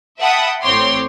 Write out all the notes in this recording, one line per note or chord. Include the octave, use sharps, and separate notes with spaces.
E5 F#5 G5 A5 B5 D#6
A1 A2 C4 C#5 C6 D6